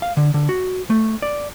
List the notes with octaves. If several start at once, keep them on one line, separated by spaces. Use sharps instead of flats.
F5
D3
D3
F#4
A3
D5